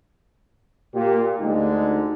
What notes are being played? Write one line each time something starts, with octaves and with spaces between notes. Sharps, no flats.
A#2 G4
D2 D3 G#3 D#4